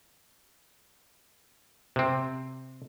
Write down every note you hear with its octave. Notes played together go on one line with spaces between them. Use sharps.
C3 C4